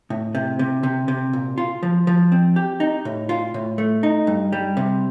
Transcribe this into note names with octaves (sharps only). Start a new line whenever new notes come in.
A2
C3
C3
C3
C3
A#2
F4
F3
F3
C4
G4
D#4
A2
F4
A2
A3
D#4
G2
G3
C3